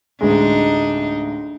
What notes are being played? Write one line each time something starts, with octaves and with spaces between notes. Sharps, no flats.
A1 D2 G#3 D4 D#4